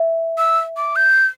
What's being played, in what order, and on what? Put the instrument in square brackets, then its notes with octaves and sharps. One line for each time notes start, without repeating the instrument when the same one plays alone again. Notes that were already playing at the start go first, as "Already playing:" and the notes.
Already playing: [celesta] E5
[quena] E6
D6
G6